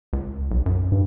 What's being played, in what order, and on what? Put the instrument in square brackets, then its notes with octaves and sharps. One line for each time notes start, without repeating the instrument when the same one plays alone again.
[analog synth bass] C#2
B1
F#2
[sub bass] G2